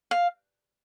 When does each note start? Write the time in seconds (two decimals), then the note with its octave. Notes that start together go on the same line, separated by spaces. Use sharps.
0.11 F5